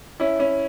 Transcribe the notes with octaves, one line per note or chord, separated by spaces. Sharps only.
C#4 E4
C#4 E4